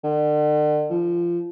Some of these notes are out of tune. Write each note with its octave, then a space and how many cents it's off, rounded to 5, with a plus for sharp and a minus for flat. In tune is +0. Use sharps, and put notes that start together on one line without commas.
D3 +40
F3 -20